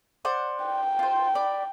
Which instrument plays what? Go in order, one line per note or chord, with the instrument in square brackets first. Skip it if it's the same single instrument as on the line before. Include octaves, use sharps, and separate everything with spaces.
[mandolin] C5 D5 F#5
[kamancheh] G5
[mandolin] F4 C5
D5 B5